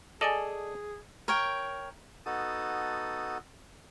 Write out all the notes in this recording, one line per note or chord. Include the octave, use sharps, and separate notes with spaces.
G#4 A4 D5 D#5 G#5 A6 A#6
A#4 C#5 G5
B3 D#4 F#4 A4 A5 D#6